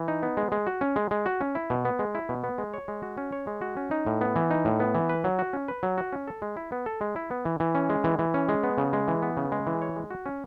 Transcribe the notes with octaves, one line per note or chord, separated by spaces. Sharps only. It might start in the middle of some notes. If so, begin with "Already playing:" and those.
Already playing: E3
D#4
B3
G#3
G#3
F#4
C#4
G#3
G#3
F#4
C#4
E4
B2
B3
G#3
E4
B2
B3
G#3
C#5
G#3
F#4
C#4
C#5
G#3
F#4
C#4
D#4
A2
B3
E3
D#4
A2
B3
E3
B4
F#3
F#4
C#4
B4
F#3
F#4
C#4
A4
G#3
E4
B3
A4
G#3
E4
B3
E3
E3
C#4
G#3
E3
E3
C#4
G#3
B3
C#3
G#3
E3
B3
C#3
G#3
E3
C#5
G#3
F#4
C#4